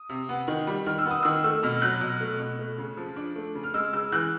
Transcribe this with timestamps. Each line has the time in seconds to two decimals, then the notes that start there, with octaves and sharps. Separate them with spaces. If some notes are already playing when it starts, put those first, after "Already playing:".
Already playing: D#6
0.09 C3
0.29 B3
0.48 D#3
0.67 G3
0.86 D#3 F6
0.99 E6
1.05 B3
1.11 D#6
1.23 D#3 E6
1.44 A3 E6
1.63 B2 F6
1.82 F#3 F#6
2.01 B2
2.20 A3
2.40 B2
2.59 A3
2.78 C#3
2.97 F3
3.16 D4
3.36 A3
3.55 C#3
3.63 F6
3.74 G#3 E6
3.93 C#3 E6
4.12 E3 F#6